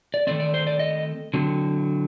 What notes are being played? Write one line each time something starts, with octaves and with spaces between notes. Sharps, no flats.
D5
D#3 A3 C4 D5
D5
C5
D5
D#5
D3 F#3 C4